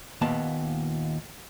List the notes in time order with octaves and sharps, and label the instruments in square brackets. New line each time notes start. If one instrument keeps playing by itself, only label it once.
[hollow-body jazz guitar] D#2 A#2 B3 A5